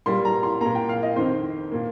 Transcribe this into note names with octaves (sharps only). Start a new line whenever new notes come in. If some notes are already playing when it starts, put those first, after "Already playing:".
A#2 G3 A#3 C6
A#5
C6
A#2 A#3 A#5
G5
F5
D#5
F2 D#3 C4 C5
A#2 A#3